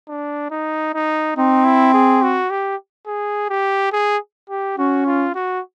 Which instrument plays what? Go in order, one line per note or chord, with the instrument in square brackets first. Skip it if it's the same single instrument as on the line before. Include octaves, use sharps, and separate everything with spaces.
[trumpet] D4
D#4
D#4
[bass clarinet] C4 [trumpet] D#4
[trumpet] E4
G#4
F#4
G4
G#4
G4
G#4
G4
[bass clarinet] C#4 [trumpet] F#4
[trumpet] F4
F#4